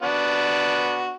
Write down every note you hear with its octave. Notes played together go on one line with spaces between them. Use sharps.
B3 D4 F#4